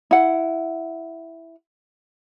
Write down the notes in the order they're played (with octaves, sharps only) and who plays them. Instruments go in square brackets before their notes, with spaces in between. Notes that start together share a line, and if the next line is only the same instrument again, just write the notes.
[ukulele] E4 F#5